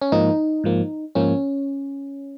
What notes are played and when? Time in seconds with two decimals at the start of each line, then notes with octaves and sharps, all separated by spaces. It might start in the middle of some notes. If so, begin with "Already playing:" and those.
0.01 C#4
0.12 G#2 F3 A#3 D#4
0.64 G#2 F3 A#3
1.15 G#2 F3 A#3 C#4